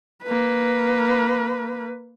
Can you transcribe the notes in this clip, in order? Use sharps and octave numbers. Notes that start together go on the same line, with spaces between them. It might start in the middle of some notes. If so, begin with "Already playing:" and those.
A#3 B4